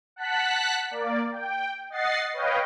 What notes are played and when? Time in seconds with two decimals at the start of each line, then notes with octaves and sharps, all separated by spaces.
0.16 F#5 A5 F#6 B6
0.91 A#3 D5
1.32 G5
1.90 D#5 F#5 A6 C7
2.34 B4 C#5 D#5 F5 G5